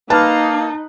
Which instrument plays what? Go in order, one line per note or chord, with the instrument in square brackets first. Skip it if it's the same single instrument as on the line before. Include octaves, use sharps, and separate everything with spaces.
[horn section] A#3 F5 [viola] D#4 [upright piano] B4 [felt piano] A5